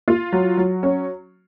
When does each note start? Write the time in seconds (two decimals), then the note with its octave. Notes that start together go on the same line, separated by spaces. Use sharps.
0.08 F4
0.32 F#3
0.57 F#3
0.83 C#4